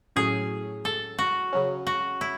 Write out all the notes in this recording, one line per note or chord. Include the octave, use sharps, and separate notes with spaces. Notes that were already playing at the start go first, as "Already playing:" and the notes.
A2 F#3 C#4 G#4
A4
F#4
C#3 F#3 C#4
F#4
E4